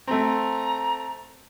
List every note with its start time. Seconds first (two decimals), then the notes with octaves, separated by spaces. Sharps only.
0.07 A3 C4 A#5